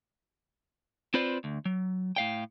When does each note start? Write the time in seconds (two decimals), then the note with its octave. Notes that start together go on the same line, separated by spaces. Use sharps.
1.14 C4 F4 B4 C5 D5
1.44 D2
1.65 F#3
2.16 A2 F5 G5